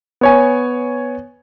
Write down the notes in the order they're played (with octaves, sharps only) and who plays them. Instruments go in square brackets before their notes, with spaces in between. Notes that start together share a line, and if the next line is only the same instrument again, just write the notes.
[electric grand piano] B3 C#5 G#5